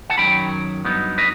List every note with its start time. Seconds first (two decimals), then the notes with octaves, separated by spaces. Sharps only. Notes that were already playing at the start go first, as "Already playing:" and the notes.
0.10 F#5 A5
0.18 F#2 D#3 F#3 G5 B5
0.85 G2 F#3 B3 D#4
1.18 B4 D#5